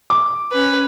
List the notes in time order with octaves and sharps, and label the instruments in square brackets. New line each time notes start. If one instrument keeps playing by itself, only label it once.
[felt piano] D6
[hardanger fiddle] C#4 B4